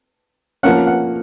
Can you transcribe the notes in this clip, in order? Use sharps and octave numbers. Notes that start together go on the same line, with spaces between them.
F3 A#3 C#4 F#5
F#5